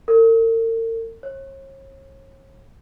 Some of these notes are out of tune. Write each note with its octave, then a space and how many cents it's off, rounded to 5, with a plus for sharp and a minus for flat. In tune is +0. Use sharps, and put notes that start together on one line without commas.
A#4 -45
C#5 -40